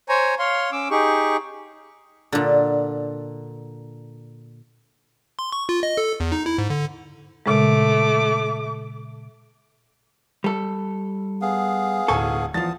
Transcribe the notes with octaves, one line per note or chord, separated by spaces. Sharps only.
C5 C#5 G#5 A#5
C#5 F5 C6
C#4 D6 E6
D#4 G4 G#4 C#6
A#2 D3
C6
C#6
F4
D#5
A4
E2
D#4
E4
G#2
D3
A#2 C#3 G#3 A3 D6
G3 A4
B3 G#4 F5
D1 B1 A4 G#5 C#6
E2 F3 B3 A5 D#6 A6